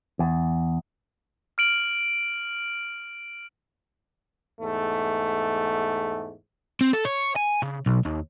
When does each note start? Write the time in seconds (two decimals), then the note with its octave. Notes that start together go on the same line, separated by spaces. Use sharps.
0.19 E2
1.58 F6 D7 F#7
4.61 E2 G#2 A3
6.81 C4
6.93 A4
7.05 C#5
7.36 G#5
7.62 C#3
7.86 B1
8.05 D#2